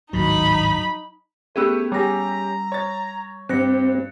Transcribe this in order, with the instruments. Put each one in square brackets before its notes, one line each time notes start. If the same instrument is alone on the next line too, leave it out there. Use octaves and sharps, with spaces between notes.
[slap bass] G#1 D2 A2 [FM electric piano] F#3 [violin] D#4 B5
[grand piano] A3 G4 E6 [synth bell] B3 C#4 G#4 [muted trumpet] B4
[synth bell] G3 A#6 [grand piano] C#4 G4 G#4 [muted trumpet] A#5
[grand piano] C#5 A6
[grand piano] G2 [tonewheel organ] C4 [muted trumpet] G4 [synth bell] F#6 A#6 C#7